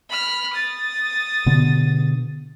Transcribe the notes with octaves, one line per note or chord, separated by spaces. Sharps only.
B5 F6
D#6 A6
B2 D3 B3